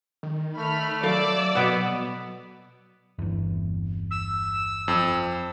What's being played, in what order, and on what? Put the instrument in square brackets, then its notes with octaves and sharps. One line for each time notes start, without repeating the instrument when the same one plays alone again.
[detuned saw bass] D#3
[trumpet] A3 [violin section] B5 F6
[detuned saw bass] F#3 [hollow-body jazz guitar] A4 F5 [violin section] D5 D6 E6
[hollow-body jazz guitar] B2 F#5 [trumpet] B3
[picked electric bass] G1 E2
[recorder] E6
[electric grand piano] F2